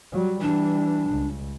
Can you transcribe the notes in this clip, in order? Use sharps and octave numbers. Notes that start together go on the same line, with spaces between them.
F#3 G3
E3 G3 D4
C#2